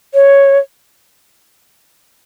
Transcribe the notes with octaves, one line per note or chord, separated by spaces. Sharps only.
C#5